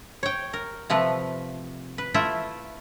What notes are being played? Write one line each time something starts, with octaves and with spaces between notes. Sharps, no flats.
C#5 G5
A#4
C3 F3 A3 B4
B4
A3 E4 F4 E5